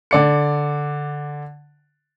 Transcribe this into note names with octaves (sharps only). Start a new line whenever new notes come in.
D3 D5 C#7